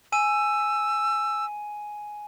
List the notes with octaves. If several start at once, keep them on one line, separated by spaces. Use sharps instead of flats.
G#5 E6 D#7